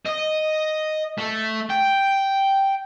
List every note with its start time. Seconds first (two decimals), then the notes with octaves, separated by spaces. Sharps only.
0.06 D#5
1.18 A3
1.70 G5